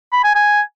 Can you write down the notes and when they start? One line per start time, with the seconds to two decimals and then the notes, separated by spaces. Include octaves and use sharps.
0.13 B5
0.24 G#5
0.35 G#5